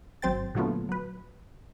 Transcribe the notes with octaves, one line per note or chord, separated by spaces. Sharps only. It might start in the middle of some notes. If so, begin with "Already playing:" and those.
G#1 F#3 C4 C5 G5 A6
A#2 D3 F#3 A3 B3 F4
F#3 B4